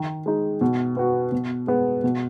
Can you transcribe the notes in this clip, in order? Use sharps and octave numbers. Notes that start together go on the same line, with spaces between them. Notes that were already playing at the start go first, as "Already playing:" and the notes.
Already playing: D#3
G#3 D#4
B2
B3 F#4
B2
G#3 B3
B2